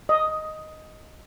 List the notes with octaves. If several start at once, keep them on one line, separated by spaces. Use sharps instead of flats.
D#5